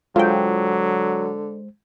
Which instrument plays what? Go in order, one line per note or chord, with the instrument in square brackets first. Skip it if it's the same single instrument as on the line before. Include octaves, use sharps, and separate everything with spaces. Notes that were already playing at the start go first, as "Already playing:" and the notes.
[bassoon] D3 [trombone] F#3 [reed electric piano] G#3 C5 [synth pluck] F4 G5